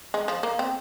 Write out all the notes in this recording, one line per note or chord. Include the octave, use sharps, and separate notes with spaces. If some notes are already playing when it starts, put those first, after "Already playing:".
G#3
F3
A#3
C4